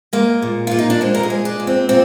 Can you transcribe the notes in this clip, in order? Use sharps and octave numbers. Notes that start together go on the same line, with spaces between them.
G#3 A#3
A#2
A#2 F4
D#4
D4
G#3 C4
A#4
G#4
G#3
D4
A#2
C4
A#2 C4